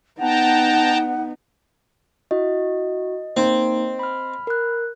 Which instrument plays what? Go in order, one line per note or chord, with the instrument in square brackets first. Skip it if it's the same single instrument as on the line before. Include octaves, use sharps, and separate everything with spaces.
[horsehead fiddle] B3 D#4 [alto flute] F#5 [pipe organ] G5 A5 A#5
[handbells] E4 F#4 [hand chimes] D#5
[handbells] A#3 D#4 [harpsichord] C4
[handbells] B5 F6
[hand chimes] A#4 F#6